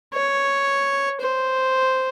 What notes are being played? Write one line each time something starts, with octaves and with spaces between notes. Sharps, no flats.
C#5
C5